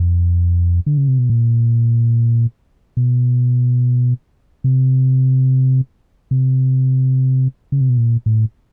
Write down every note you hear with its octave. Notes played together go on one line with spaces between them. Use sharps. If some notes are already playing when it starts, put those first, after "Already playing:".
Already playing: F2
D3
C#3
C3
B2
A#2
B2
C3
C3
C#3
C3
B2
A#2
A2